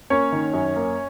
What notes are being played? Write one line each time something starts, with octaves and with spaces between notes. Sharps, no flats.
A#3 C#4 C#5
D#3
F#2
A#3